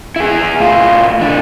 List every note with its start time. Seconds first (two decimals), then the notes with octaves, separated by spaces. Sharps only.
0.16 E4 G#4
0.60 A2 F4
1.21 E3 D4